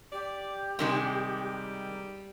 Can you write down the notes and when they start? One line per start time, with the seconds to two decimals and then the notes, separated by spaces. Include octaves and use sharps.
0.12 G4 D5
0.79 C3 D#3 G3 G#3